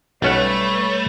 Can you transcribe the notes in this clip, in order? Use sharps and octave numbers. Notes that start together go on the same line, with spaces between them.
B1 G3 A3 C#4 B4 C#5 F#5